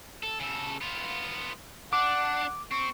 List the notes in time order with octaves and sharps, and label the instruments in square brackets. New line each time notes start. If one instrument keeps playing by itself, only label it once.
[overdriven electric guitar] A4
C#3 A4
B3 F4
[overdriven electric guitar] D4 [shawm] F#5 [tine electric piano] D6
[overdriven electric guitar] C4 [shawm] C#6